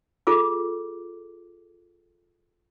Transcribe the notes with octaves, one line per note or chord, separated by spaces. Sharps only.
F4 G#4 A4 D6 E6